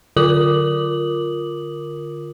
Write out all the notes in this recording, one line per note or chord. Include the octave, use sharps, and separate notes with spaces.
D3 F4 A#4 D6 D#6 F#7